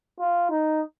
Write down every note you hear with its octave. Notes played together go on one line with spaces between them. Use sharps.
F4
D#4